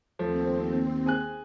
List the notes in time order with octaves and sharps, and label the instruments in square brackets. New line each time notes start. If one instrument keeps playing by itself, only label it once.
[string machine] D#2 C4 [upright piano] F3 A3
[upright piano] G#4 G#5 F#6